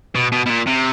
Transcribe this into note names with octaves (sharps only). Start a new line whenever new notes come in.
B2
B2
B2
A#2
C3